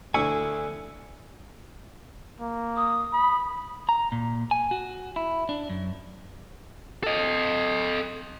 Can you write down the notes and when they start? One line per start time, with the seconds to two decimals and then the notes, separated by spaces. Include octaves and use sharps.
0.14 D2 E4 G#5 C#6
2.40 A#3
2.77 D#6
3.13 B5
3.89 A#5
4.12 A#2
4.51 G#5
4.71 F#4
5.16 E4
5.49 D4
5.70 F#2
7.03 A4 D#5